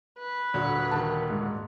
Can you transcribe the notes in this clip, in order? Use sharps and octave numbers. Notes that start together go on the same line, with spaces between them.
B4
D#1 D3 F#4
D#3 A5
G#2